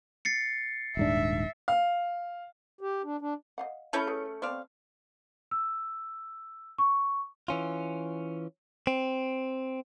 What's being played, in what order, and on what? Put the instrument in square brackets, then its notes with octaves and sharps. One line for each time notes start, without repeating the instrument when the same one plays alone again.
[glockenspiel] A6 C7 C#7
[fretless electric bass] D#1 G#2 D4 [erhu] E5
[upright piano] F5
[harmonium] G4
D4
D4
[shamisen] D#5 F5 F#5
[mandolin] A3 C#4 G6 [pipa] E4 A4 C#5 [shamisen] A5 B5
[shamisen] G#4 B4
[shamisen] B3 C4 [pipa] C5 D5 F5
[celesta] E6
C#6
[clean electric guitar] E3 C#4 F4
C4